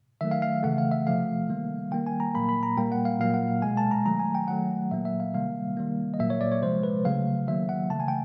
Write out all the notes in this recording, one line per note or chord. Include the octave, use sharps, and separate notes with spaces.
D#3 F#3 A3 E5
F5
F5
C#3 E3 A3 F#5
F5
E5
C3 F3 A3 F5
D#3 G3 A#3
D#3 G3 A#3 G5
G#5
A#5
A#2 F#3 A#3 B5
B5
A#5
A#2 G3 A#3 G5
F#5
F5
A#2 F#3 A#3 F5
F#5
B2 G#3 G#5
A5
A#5
D#3 F#3 A3 A#5
G#5
G5
D#3 F#3 A3 F#5
A#2 F#3 A#3 E5
E5
F5
C3 D#3 G3 A#3 F5
D#3 G3 A#3
D#5
A#2 F#3 A#3 E5
C#5
D5
C#5
C3 F3 G#3 C5
B4
C#3 F#3 A3 F5
D#3 F#3 A#3 E5
F#5
C#3 E3 A3 A5
G#5
G5